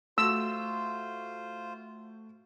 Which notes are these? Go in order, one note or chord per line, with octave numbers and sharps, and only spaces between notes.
A3 F4 F#4 C5 E6